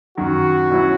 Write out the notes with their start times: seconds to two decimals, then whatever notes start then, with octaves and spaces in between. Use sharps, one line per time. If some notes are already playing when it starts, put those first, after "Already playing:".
0.18 F#2 D#3 F#3 F#4
0.70 B2 F#3 C#4 E4